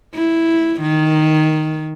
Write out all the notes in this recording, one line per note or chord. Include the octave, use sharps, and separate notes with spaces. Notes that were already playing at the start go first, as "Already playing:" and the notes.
E4
D#3